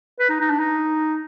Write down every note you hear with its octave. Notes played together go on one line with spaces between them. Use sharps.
B4
D#4
D#4
D4
D#4